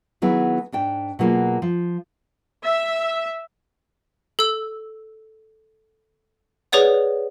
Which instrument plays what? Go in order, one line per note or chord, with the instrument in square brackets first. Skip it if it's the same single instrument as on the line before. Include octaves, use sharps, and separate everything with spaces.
[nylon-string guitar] D#3 F#3 B3 E4 G#4
G#2 D4 G5
B2 F#3 A#3 F4 G#4
F3
[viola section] E5
[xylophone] A4 E6
G#4 B4 C#5 D5 F#5